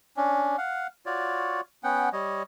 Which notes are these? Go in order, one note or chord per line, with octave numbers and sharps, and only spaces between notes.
C#4 D4
F5 F#5
F4 F#4 C#5 D5
B3 C#4 F#5 G5
G3 C#5 D#5